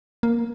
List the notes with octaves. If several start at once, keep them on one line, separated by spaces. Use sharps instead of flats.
A#3